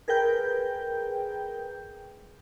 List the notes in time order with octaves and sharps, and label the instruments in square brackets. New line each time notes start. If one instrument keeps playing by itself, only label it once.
[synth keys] G#4 A#4 B4 G5 G6